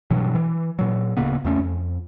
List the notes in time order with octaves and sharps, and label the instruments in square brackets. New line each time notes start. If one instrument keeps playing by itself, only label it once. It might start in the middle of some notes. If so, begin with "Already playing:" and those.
[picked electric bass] G2 B2 E3 F#3
E3
A#2 F#3
D1 C#3 A#3 B3
E2 A3 C4 C#4
F2